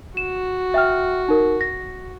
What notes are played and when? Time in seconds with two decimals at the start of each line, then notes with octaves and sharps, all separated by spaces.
0.17 F#4 E7
0.74 E5 G5 F6
1.28 D#4 A#4
1.61 A#6